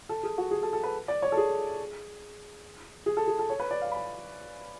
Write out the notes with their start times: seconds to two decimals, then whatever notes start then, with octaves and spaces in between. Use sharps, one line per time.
0.09 A4
0.23 G#4
0.38 F#4
0.51 G#4
0.63 A4
0.73 A4
0.83 B4
1.08 D5
1.22 C#5
1.32 A4
1.37 G#4
3.06 G#4
3.17 A4
3.27 G#4
3.39 A4
3.50 C#5
3.60 B4
3.71 D5
3.81 F5
3.92 B5